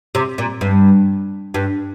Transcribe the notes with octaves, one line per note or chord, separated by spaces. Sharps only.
C3
A#2
G2
G2